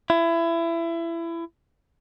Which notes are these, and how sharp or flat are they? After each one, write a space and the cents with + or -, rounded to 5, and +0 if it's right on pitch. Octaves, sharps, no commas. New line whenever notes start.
E4 +25